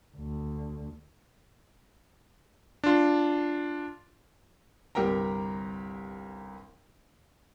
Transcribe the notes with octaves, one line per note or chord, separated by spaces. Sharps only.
D2
D4 F4
G1 C2 G4 A#4 G5 A#5